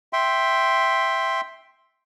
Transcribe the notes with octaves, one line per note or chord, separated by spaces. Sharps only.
E5 G5 C6